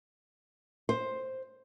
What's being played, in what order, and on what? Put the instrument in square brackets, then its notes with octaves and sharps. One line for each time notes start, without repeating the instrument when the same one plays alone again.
[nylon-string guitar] C5